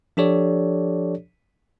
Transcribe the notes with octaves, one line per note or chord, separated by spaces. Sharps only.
F3 D4 G4 A4 C#5 D5